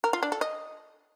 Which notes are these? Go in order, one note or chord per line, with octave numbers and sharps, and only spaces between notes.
A#4
F4
D4
A4
D#5